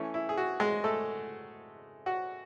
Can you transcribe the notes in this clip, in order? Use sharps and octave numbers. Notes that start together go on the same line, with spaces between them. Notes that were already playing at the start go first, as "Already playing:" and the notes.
Already playing: E3 A3 C#4
E4
G#4
F#4
G#3 G#4
A3 A4
F#4 F#5